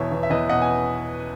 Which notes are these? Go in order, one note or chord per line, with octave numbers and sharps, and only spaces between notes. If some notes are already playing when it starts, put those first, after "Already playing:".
Already playing: E2 B2 C#5 E5
E2
E5
E2 B4 D#5
B2 D#5 F#5
G#5